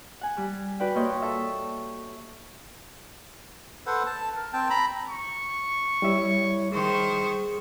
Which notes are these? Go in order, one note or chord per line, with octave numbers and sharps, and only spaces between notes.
F#5 G#5
G3
F#4 B4 D5 G5
A#2 C#5 D#5 G6
A4 E5
A4 B4 C5 F#5
A5
A#4
C4 G5 A5
A#5 B5
C#6
G3 E4 C#5 E5
D#3 G#4 C5 C#6